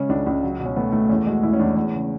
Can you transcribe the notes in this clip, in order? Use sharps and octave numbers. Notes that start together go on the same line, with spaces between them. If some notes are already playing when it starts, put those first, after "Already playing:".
Already playing: C#3 G#3 C#4
C#2 D4
C#2 D4
F#3
B2
C#4
A3 B3
A3
E2 C#4
G#3 F#4
E2 E4
C#4
E2 D4
E2 C#4
C#3